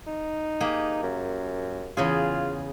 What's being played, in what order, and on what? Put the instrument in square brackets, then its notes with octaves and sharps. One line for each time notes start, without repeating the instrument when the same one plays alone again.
[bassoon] D#4
[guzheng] A#3 G4 G#4
[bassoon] F#2
[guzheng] E2 C#3 G#4 [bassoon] F4